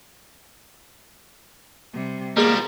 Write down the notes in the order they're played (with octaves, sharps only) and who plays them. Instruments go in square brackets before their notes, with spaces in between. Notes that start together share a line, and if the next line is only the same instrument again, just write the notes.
[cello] C3 G3
[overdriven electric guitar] F3 G3 [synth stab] G#3 G#4 B6 [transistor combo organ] A#3 [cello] B3